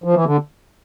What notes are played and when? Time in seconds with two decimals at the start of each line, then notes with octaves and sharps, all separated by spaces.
0.04 F3
0.14 E3
0.26 D3